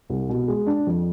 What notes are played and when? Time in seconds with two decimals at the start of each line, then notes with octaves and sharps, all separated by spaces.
0.10 C2
0.29 B2
0.48 G#3
0.67 D4
0.87 F2